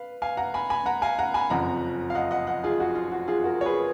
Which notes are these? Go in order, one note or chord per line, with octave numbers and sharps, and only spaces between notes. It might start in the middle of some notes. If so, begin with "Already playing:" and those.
Already playing: B4 F5
F5 G#5
F#5 A#5
G#5 B5
G#5 B5
F#5 A#5
F5 G#5
F#5 A#5
G#5 B5
F#1 F2 F3 F#5 A#5
F5
D#5 F#5
D#5 F#5
D#5 F#5
F4 G#4
F#4
F4
F#4
F4 G#4
F#4 A#4
C#5
G#4 B4